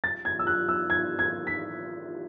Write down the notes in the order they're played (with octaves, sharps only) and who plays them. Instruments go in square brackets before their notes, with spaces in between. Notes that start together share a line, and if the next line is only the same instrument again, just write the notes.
[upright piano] A6
G#6
E6
F#6
E6
G#6
G#6
B6